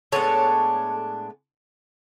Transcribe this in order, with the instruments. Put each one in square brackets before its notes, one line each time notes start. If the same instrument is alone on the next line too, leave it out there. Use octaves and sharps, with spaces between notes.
[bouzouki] A2 G#3 B3 D4 A4 C#5